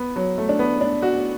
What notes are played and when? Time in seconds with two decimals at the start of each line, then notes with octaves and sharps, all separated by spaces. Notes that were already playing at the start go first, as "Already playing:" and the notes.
Already playing: B3
0.16 F#3
0.38 A3
0.49 D4
0.59 B3
0.81 D4
1.02 F#4